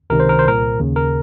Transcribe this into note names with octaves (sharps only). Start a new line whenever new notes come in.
C#2 C3 D#3 A#4
C5
A#4
C5
C2 A#2 A#4
D#2 C#3
A#4